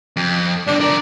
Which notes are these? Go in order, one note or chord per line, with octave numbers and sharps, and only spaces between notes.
F2
G2 D3 D4
D4 A#4 D5